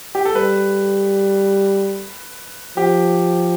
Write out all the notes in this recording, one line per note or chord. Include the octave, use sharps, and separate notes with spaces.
G4
A4
G3 B4
F3 G4